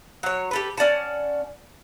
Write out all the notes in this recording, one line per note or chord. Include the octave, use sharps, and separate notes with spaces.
F#3 C#5
G4 A4 B4
C#4 D5 F#5 A5